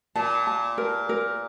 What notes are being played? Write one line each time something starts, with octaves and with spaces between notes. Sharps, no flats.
A#2 A5
A5
A#4
A#4